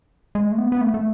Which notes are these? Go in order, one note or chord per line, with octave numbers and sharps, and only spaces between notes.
G#3
A3
B3
B3
A3
A3